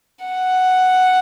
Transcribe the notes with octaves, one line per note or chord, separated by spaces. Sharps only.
F#5